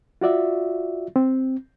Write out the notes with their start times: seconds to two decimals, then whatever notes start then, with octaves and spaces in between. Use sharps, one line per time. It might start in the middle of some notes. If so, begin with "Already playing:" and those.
0.21 F4 F#4 D5 E5
1.16 C4